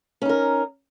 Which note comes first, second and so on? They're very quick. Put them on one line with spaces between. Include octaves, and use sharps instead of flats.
C#4 D#4 A#4